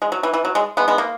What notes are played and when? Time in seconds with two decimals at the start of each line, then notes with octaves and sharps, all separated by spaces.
0.02 G#3
0.12 F#3
0.23 E3
0.34 E3
0.45 F#3
0.55 G#3
0.77 G#3 B3
0.88 G#3 B3
0.98 A#3